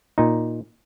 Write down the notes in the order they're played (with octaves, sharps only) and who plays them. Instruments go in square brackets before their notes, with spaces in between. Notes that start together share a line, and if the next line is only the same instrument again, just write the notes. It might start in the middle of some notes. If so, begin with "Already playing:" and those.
[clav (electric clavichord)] A#2 D#4